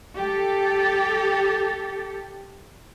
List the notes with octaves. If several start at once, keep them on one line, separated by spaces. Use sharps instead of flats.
G4 A4